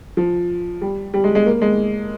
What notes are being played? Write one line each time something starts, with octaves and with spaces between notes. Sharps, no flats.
F3
G3
G3
G#3
G#3
A#3
G#3